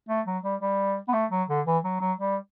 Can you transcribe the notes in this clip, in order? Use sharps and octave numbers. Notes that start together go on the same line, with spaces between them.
A3
F#3
G3
G3
B3
A3
F#3
D3
E3
F#3
F#3
G3